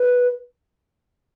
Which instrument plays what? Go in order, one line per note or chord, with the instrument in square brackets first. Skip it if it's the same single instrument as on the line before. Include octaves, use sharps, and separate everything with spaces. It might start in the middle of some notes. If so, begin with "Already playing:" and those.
Already playing: [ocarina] B4